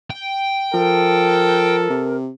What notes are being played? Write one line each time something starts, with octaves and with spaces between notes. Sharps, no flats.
G5
F3 A4 A#4
C3